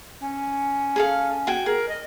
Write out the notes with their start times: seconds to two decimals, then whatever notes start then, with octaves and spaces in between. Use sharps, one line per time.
0.20 C#4
0.96 G#4 A4 F5
1.47 F#4 G5 G#5
1.66 G#4 A#4
1.89 D#5